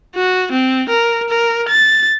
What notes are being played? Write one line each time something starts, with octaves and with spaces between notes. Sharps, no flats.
F#4
C4
A#4
A#4
A6